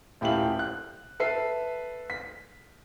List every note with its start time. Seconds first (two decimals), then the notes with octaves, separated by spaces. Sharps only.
0.21 D#1 A2 G4 E5 F5 F#7
0.59 F#6
1.20 A4 B4 E5 C7
2.10 B6